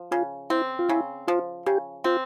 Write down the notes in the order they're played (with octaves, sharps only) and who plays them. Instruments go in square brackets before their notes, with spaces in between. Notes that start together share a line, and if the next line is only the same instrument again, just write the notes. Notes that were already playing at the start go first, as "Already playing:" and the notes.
Already playing: [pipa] F3
[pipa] C#3 [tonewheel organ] F4
[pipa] C4 [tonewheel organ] E4
[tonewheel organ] F4
[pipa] C#3 [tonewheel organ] E4
[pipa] F3 [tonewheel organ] F4
[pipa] C#3 [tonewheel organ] G4
[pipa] C4 [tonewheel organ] F4